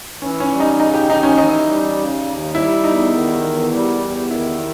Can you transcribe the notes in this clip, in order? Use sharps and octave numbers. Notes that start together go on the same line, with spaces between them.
E3 C#4
C#4
G3
D#4
C#3 D#4
G4
D#2 D#4
C#4
E3 D#4
G3
C#3
D#2
G3 E4
E2 D#4
D#3
E2
G3
E2
D#3 E4